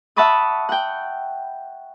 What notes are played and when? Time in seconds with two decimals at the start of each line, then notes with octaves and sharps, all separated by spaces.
0.16 E5 F#5 A5 B5 C#6 D#6
0.69 F#5 G5